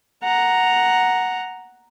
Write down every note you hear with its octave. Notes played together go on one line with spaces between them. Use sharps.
F#5 A#5